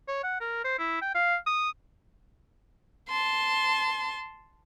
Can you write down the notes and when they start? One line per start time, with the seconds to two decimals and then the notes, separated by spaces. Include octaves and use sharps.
0.08 C#5
0.24 F#5
0.41 A#4
0.64 C5
0.79 E4
1.02 G5
1.15 F5
1.46 D#6
3.09 A5 C6